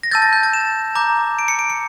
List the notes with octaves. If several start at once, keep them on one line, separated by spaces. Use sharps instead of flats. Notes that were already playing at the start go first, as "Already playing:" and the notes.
A#6
A5 E6 G6 A6
A6
G6
A6
E7
A#5 D6 G6
D7
C#7
D7
C#7